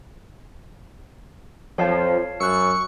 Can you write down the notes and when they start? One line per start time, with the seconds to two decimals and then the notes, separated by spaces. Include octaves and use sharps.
1.78 F2 F3 C#5 F5 A5
2.40 F#2 C#6 E6 F#6 C#7